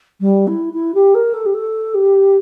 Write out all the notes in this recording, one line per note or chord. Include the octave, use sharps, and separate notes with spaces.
G3
E4
E4
G4
A#4
A4
G4
A4
G4